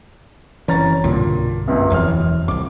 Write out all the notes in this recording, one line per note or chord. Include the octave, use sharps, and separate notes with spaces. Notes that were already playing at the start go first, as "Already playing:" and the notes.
F#1 E3 C#4 A#5 A6
B1 G2 A#2 D3
F#1 C#2 F#2
E1 F2 E3 C#5 F6
C2 F2 D6